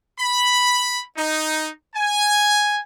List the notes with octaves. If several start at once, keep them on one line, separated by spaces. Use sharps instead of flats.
B5
D#4
G#5